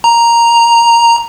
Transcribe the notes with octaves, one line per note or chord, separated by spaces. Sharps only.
A#5